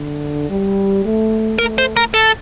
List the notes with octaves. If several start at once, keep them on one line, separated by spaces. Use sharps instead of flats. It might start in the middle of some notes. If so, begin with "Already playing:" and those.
Already playing: D3
G3
A3
A3 A#4
C5
A#4
A4